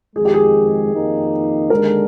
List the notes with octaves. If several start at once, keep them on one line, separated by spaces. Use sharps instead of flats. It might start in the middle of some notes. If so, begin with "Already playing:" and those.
F2 D#3 G#3 G#4
G4
G#4
F2 D#3 A#3 D#4
D#2 D3 G#3 D4 A#4